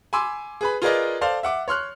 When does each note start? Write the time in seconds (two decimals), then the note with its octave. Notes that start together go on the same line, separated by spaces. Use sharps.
0.13 G#5 B5 C6 D6 E6
0.61 G#4 B4 B5
0.82 F4 G#4 A#4 B4 D5 D#5
1.21 A4 C5 D5 F5
1.43 E5 F#5 D6
1.68 C#5 C6 F6 F#6